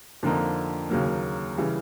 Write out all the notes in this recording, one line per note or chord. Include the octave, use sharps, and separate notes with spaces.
F2 D3 F3 A#3 D#4
D#2 C#3 F#3 A#3
C#3 E3 G3